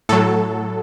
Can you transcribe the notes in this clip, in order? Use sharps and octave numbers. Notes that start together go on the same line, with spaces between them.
A2 F#3 A4